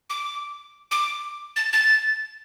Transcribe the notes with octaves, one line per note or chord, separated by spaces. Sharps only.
D6
D6
A6
A6